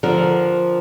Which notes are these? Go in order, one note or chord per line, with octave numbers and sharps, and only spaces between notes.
D3 F3 A#4